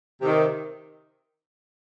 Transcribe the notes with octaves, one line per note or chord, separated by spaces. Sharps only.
C3 D#3